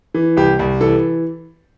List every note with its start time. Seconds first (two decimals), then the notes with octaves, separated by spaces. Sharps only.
0.14 E3
0.37 C2 G4
0.59 C2
0.81 E3 A4